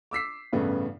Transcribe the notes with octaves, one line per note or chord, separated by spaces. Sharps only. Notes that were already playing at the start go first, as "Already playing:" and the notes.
D6 E6 B6 C7
A1 G2 C#3 A3 B3